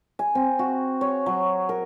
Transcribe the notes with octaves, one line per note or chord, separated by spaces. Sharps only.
G#5
C4
F#4
C#5
F#3
A#4